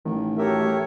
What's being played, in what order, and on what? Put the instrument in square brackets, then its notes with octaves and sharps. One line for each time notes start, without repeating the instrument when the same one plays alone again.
[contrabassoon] A1 [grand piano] D#3
[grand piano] F#4 G4 A4 [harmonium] A#4 E5 [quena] C#5
[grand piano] A3 G4